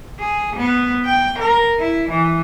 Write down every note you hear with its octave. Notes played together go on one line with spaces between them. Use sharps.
G#4
B3
G5
A#4
E4
E3